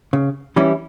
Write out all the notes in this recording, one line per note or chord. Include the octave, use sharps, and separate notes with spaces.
C#3
E3 G3 C#4 E4